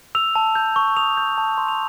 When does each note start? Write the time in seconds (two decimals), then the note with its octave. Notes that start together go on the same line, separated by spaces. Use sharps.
0.15 E6 F7
0.36 A5
0.55 G6
0.76 C#6
0.97 D#6 F7
1.17 G6
1.38 A5
1.58 C6
1.68 F7